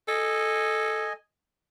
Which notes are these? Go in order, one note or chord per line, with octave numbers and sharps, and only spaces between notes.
A4 D#5 G#5